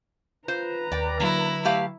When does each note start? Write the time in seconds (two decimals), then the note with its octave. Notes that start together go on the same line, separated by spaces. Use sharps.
0.48 F4 B4 C5 A#5
0.92 D#2 D5 G5
1.20 D3 F#3 A#3 E4
1.65 A3 G4 F5